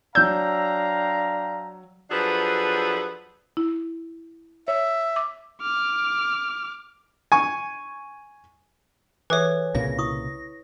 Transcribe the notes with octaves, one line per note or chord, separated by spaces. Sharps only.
F#3 D4 F5 G5 A#5 E6 G6
F3 F#3 D4 G#4 A4 B4
E4
C#5 E5
D6
D6 F6
G#5 C#6
E3 G#4 A4 B4 C#5 E5
C2 A#2 C#3 G#5 A#6
E4 C#6 D#6